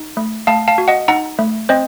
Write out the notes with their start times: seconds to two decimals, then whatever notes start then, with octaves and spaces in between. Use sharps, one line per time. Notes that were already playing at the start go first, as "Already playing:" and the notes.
Already playing: D#4
0.17 A3
0.47 A3 F5 A5
0.68 F5 A5
0.78 F#4
0.88 D#5 F#5
1.08 D#4 F#5 A#5
1.39 A3
1.69 C4 C5 D#5